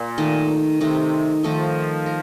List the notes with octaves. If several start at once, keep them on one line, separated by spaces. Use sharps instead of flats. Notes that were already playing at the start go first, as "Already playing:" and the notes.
Already playing: A#2
D#3 A3 D#4
C3 D#3 A3 D#4
D#3 F3 A3 D#4
A#4